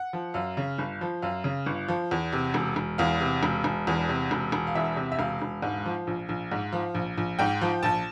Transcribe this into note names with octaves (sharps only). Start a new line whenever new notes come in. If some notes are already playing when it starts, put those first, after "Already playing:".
Already playing: F#5
F3
F#2 F5
C#3
G1
F3
F#2 F5
C#3
G1
F3
E2
C3
E1
E1
E2 F5
C3
E1
E1
E2
C3
E1
E1
F5
E2 E5
C3
E5
E1 F5
E1
G#2
F3
A#1
A#1
G#2
F3
A#1
A#1
G#2 G5
F3
A#1 A5